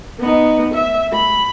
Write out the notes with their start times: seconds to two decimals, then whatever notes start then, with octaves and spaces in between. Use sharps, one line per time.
0.20 B3 D#4
0.74 E5
1.12 B5